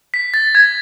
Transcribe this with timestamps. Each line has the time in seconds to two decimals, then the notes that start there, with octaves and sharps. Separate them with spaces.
0.14 B6
0.34 A6
0.55 G#6